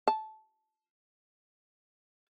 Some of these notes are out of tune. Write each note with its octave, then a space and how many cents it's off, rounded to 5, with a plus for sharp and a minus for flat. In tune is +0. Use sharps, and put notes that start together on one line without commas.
A5 -15